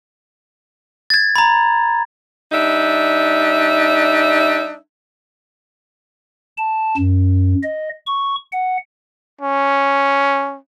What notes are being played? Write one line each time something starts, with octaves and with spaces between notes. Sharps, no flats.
G#6 A6
A#5 B5
G3 D4 D#4 E5
A5
F#2
D#5
C#6
F#5
C#4